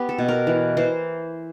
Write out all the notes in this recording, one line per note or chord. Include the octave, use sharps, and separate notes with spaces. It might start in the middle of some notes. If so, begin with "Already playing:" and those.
Already playing: B3 G4
A4
B2
A#4
E3
E3 C5